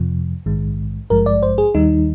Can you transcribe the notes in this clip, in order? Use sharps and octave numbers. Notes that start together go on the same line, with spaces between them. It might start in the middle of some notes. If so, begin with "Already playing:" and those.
Already playing: F2 C3 F3
A#1 G#2 D#3 G#3
G#1 G2 F3 G#3 A#4
D5
C5
G#4
D#2 D#3 G3 D#4